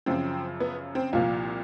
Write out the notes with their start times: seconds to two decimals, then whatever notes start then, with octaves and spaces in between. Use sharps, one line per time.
0.06 F#2 C#3 F3 C4
0.60 B3
0.95 C4
1.13 C2 A#2 F3 F4